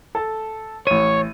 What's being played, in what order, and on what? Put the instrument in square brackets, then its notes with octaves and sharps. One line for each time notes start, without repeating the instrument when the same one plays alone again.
[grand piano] A4 A5
[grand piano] A1 D#7 [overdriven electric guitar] C#5